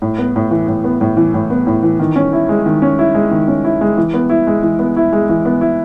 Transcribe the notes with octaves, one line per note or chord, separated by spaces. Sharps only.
A2
B3
A2
E3
A2
B3
A2
E3
A2
B3
A2
E3
D#3
C#4
E4
G#3
D#3
C#4
E4
G#3
D#3
C#4
E4
G#3
E3
B3
E4
G#3
E3
B3
E4
G#3
E3
B3
E4